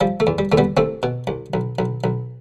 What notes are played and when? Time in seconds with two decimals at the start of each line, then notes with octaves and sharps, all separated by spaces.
0.01 F3 G3
0.20 A3
0.27 E2
0.38 G3
0.52 E2 A3
0.58 G3 B3
0.77 C2 A3 C4
1.03 B2
1.27 C2
1.54 B1
1.79 B1
2.04 B1